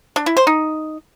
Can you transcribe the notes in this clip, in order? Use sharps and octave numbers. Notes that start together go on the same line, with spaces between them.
D4
E4
C5
D#4